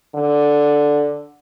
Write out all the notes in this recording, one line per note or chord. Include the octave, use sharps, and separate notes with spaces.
D3